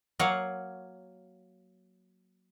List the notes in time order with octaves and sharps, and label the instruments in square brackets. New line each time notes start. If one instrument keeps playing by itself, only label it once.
[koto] F#3 A#3 C#5 F5 F#5